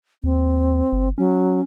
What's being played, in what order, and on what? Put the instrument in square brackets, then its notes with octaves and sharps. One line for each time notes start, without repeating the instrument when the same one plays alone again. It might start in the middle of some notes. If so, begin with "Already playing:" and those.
[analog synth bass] D#2 [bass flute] C4
[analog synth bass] G1
[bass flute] F#3 [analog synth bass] C#4